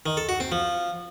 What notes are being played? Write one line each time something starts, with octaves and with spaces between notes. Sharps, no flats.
D#3
A4
F#4
C4
F3